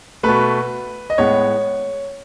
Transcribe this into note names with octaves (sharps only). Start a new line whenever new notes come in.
B2 A3 B4
D#5
A2 G#3 B3 C#5